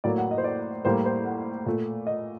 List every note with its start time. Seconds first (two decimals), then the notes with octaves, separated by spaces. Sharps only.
0.04 A2 F#3 A#3 D5
0.18 F#5
0.31 D#5
0.38 C5
0.44 D5
0.85 A2 G3 A#3 C5
1.05 C5
1.26 F#5
1.66 A#2 A3
2.07 D#5